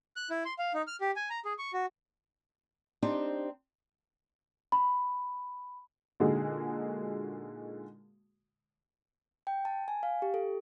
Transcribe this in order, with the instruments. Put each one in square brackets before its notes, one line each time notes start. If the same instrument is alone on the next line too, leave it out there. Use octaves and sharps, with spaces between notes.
[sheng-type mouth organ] F#6
E4
C6
F5
D#4
F6
G4
G#5
A#5
G#4
C#6
F#4
[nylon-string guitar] C4 D4 D#4 G4 C5
[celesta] B5
[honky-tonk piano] A#2 D3 G#3 D#4 F#4 G#4
[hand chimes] G5
A5
G#5
F5
G4
A4